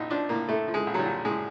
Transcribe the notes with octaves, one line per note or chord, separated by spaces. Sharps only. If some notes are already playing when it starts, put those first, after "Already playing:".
Already playing: A#1 D#4 E4
F3 D4
A2 A#3
A2 A3
F3
G#3
A#1
F#3
G3
A#1
A2 G#3